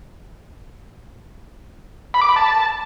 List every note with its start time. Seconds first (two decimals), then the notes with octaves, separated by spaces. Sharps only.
2.14 B5
2.22 D6
2.29 B5
2.36 A5